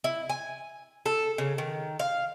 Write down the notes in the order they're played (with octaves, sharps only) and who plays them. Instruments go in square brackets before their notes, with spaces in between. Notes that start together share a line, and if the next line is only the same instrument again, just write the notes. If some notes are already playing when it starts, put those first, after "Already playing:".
[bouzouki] E4
G#5
A4
C#3
D#3
F5